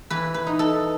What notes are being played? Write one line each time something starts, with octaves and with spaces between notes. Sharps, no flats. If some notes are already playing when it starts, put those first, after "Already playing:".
E3 B4
B4
D#4
A4